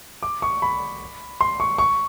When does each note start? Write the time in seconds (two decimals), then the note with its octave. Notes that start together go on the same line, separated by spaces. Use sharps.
0.23 D6
0.42 C#6
0.62 B5
1.41 C6
1.60 C#6
1.78 C#6